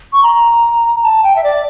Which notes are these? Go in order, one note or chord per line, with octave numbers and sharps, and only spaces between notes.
C#6
A#5
A5
G5
E5
D5